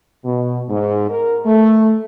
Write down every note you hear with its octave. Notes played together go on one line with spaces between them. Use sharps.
B2
G#2
A#4
A3